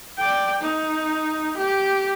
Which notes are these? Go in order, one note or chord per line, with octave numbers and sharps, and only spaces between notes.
D5 G5
D#4
G4